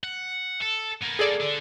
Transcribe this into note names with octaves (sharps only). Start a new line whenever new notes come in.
F#5
A4
A#3 B3
G#4 A4 D5
D3 D4